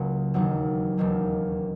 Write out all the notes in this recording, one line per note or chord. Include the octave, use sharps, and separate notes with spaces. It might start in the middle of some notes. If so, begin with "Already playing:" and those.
Already playing: C#2 C#3 F#3 A#3 C#4
E1 D#2 D#3 F#3
E1 D#2 D#3 F#3